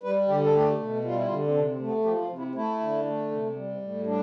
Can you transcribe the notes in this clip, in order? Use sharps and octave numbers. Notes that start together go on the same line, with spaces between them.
G3 B4
D3 G4
A4
A3 G4
B2
G3 F4
E4
F4
D3
C4
C3 D4
C4
A3
B3
F3 G4
F4
C3
E4
A3 E4
D3
A3
C3
G3
A2
G3 D4